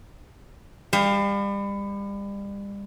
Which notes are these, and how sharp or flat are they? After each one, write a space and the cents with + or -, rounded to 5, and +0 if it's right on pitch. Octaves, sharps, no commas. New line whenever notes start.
G3 +35 F5 +0